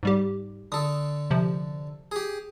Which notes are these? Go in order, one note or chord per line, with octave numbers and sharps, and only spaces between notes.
G#2 G3 G4
D3 A4 D#6
C3 F3
G4 G#4